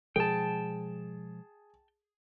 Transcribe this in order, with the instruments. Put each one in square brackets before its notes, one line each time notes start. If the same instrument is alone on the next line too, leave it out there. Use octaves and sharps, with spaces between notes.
[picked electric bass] B2 F3 G#3 [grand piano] G#4 [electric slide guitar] G5 A5